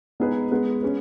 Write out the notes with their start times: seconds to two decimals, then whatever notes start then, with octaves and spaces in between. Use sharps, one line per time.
0.20 G#3 B3 D#4 G#4 B4
0.51 G#3 B3 G#4 B4
0.83 C#4 G#4 B4